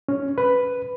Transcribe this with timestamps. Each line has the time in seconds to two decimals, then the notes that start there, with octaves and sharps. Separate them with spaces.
0.08 C#4
0.38 B4